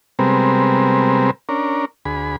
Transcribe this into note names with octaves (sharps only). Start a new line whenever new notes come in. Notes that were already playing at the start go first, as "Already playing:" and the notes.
C3 G3 G#3 B3 C4 A#4
C#4 D4 A#4
D2 G#4 B5